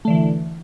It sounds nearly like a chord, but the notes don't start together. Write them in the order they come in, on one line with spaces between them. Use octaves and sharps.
A3 D3 E3